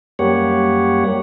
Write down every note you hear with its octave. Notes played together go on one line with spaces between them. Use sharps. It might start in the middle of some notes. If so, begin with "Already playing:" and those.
F#2 G3 A#3 G4 C#5 F#5